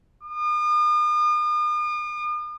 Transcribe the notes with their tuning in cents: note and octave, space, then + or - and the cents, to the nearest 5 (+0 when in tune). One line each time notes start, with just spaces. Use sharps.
D#6 -45